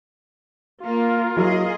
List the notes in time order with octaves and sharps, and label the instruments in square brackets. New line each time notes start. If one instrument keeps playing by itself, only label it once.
[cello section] A#3 [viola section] F4 A#4
[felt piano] F#3 E4 [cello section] G#4 D#5